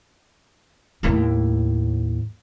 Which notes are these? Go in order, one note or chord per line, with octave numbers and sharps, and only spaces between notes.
D#2 A2